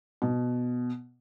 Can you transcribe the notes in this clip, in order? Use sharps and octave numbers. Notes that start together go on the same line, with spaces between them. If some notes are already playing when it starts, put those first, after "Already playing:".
B2